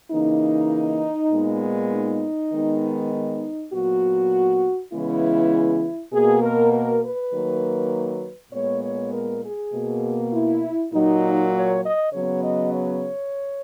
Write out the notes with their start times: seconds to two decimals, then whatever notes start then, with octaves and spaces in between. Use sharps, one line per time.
0.12 C#3 E3 A#3 D#4
1.33 A#2 G#3 B3
1.92 D#4
2.53 D#3 G#3 B3
3.12 D#4
3.72 A#2 F#3 B3 F#4
4.92 C#3 E3 G#3 B3 E4
6.13 B2 A#3 G#4
6.43 A#4
6.73 A#4
7.03 B4
7.33 D#3 F#3 A#3
8.53 A#2 G#3 B3 C#5
8.82 C#5
9.13 A#4
9.43 G#4
9.73 B2 A#3
10.33 E4
10.93 A#2 F#3 A#3 D#4
11.53 C#5
11.83 D#5
12.13 C#3 F#3 B3 C#5
12.43 D#5
12.73 C#5